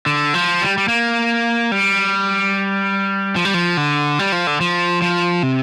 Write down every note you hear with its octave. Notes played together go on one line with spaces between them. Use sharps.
D3
F3
G3
G3
A#3
G3
F3
G3
F3
D3
G3
F3
D3
F3
F3
C3